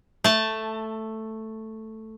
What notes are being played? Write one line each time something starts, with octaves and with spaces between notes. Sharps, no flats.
A3 A5